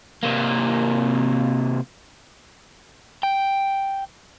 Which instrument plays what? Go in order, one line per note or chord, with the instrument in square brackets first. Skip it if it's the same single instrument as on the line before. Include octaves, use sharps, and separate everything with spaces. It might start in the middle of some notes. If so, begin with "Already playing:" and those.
[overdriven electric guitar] C3 A#3
G5